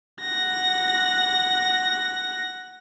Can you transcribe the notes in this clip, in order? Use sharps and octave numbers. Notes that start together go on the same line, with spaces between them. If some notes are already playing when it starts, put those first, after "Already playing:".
F#5 A#6